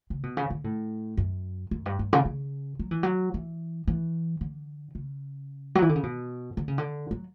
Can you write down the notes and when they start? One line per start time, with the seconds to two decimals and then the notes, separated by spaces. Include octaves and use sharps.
0.10 C#3
0.23 B2
0.37 C#3
0.50 D3
0.64 A2
1.17 F#2
1.71 F#2
1.86 G2
1.99 G2
2.13 C#3
2.25 C#3
2.79 F#3
2.91 E3
3.03 F#3
3.34 E3
3.88 E3
4.41 D3
4.95 C#3
5.75 F#3
5.82 E3
5.89 D3
5.95 C#3
6.03 B2
6.57 D3
6.68 C#3
6.78 D3
7.11 F#3